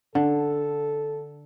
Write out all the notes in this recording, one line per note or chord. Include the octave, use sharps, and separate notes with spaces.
D3 A4